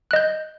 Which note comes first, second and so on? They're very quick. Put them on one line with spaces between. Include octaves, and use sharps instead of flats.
F#6 D#5 G6